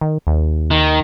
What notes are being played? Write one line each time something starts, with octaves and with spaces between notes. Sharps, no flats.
D#3
D#2
D#3